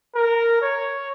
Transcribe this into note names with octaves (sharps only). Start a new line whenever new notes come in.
A#4
C#5